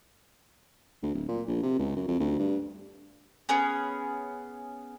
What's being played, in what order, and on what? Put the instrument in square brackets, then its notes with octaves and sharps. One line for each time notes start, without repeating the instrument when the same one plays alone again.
[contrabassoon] D2
D1
A#2
A#1
C3
C#2
F#2
F2
D2
G2
[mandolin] B3 C#4 G#4